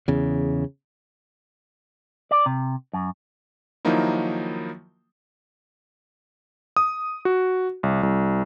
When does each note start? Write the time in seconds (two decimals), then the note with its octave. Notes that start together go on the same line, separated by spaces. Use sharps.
0.08 E2 C#3
2.31 D5
2.46 C3
2.93 F#2
3.85 D#3 F3 F#3 A#3 D#4 E4
6.76 D#6
7.25 F#4
7.83 C2
8.03 C2